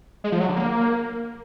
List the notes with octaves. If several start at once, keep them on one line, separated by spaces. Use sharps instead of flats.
G#3
F3
F#3
D3
A#3